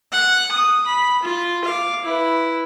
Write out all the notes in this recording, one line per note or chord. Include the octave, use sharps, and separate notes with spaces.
F#5
D#6
B5
F4
F5 D6
E4 B4